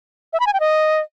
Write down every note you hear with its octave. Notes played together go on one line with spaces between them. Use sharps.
E5
B5
G#5
G5
D#5